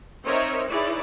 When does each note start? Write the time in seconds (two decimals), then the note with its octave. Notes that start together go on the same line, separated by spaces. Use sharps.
0.25 C4 D#4 A#4 C#5 D#5 E5
0.70 D#4 E4 G#4 B4 C#5 D5